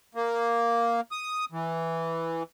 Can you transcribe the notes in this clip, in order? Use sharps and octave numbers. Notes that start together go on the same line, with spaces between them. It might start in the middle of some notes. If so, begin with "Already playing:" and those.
A#3
D#6
E3